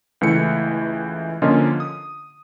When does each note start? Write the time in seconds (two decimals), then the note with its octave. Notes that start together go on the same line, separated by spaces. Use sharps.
0.21 C#2 E3 A3 C#7
1.42 D3 F3 A#3 C#4 F4 D#5
1.80 D#6